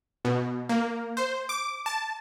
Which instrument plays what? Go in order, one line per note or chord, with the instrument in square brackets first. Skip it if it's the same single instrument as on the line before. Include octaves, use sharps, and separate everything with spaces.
[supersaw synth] B2
A#3
C5
D6
A5